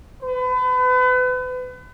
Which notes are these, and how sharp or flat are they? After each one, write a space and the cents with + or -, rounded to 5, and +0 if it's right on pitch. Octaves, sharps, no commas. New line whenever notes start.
B4 +35